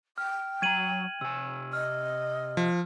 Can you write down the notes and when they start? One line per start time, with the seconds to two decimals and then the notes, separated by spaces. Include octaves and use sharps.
0.18 G5 F6
0.62 F#3 A#5 G#6 D#7 F#7
1.21 C3 G#5 E6
1.73 D#5 F6
2.57 F3